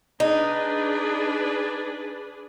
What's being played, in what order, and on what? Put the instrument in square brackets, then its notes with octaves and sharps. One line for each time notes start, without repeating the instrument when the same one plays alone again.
[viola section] D4 G#4 B4 [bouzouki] D#4